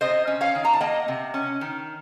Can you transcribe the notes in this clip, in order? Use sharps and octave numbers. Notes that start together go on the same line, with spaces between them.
C3 C5 D#5
C#4
C#5 F5
D#3
A#5
A5
A#3 D#5 F#5
C3
C#4
D#3